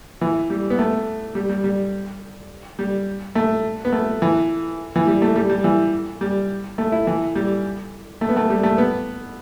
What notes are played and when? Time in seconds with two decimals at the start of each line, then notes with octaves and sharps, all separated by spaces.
0.21 E3
0.50 G3
0.70 B3
0.79 A3
1.35 G3
1.49 G3
1.64 G3
2.79 G3
3.35 A3
3.85 B3
3.92 A3
4.22 E3
4.96 E3
5.07 G3
5.22 A3
5.36 G3
5.49 G3
5.64 E3
6.21 G3
6.78 A3
6.92 E4
7.07 E3
7.35 G3
8.21 A3
8.29 B3
8.37 A3
8.50 G3
8.63 A3
8.78 B3